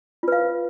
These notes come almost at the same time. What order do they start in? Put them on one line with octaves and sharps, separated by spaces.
F4 B4 F5